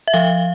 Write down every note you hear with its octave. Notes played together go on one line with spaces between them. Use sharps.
E5
F3 F5